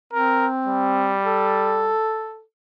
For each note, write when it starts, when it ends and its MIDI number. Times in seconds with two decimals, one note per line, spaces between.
0.13 1.15 60
0.13 0.47 70
0.66 1.95 55
1.25 2.42 69